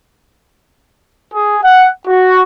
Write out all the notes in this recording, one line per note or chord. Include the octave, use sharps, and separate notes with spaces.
G#4
F#5
F#4